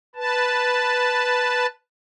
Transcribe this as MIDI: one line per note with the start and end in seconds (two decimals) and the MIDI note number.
0.16 1.67 71
0.16 1.67 81